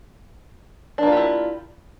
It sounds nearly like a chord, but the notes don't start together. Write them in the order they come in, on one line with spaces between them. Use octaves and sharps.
D4 A#3 F4 G4 E4